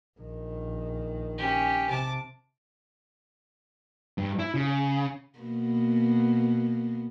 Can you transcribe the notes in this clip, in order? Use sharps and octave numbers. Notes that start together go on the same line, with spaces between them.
A#1 D#3
C#4 G4
C3 A5 D6
G2
E4
C#3
B2 A#3 B3